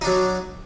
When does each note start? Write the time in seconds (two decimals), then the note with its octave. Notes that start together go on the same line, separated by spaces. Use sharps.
0.01 D#4
0.04 D4
0.07 F#3